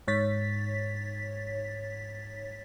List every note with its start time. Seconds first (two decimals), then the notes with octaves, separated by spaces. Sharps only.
0.08 G#2 C#5 A6 B6